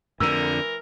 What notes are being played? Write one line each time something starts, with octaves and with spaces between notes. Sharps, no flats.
F2 D3 E3 A#4 E6